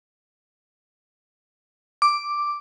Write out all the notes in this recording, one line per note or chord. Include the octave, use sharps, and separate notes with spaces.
D6